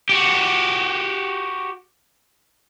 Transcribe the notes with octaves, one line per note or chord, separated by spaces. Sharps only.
F#4 G4